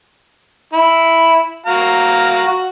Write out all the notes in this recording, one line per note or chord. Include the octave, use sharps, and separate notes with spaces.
E4
F#4 F5 A#5
F#4